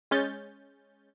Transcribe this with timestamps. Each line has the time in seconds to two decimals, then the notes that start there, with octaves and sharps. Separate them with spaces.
0.11 G#3 C#4 G6 A6